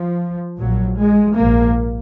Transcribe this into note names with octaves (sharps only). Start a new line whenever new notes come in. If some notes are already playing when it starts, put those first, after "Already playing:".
Already playing: F3
A#1 A#2 F#3
G#3
A#1 G#2 A#3